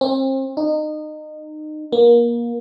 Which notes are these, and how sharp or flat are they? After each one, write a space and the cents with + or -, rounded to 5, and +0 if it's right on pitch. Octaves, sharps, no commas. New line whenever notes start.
C4 +35
D#4 -25
A#3 +25